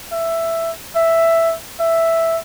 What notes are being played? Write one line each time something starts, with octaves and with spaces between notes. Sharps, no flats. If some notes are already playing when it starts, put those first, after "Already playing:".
E5
E5
E5